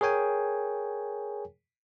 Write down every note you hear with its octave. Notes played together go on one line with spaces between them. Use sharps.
G#4 A#4 C#5 G5 G#5